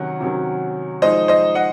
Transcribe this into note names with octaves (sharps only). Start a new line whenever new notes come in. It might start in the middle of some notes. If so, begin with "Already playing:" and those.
Already playing: C3 D#3 F#3 C#4 F#5
C3 D#3 F#3 C#4
F3 G#3 D#4 C5 D#5
C5 D#5
D#5 F#5